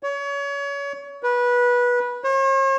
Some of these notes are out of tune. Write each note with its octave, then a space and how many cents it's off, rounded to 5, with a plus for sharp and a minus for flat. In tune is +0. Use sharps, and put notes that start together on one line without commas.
C#5 +30
B4 -20
C#5 -45